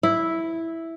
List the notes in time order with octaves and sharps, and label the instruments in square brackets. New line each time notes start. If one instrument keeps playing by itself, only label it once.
[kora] E4